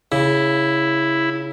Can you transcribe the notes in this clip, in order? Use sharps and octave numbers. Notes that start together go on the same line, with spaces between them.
C#3 E4